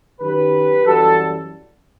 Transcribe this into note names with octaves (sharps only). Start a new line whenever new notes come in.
F#2 D#3 F#3 G4 B4
F#2 E3 G3 F#4 A4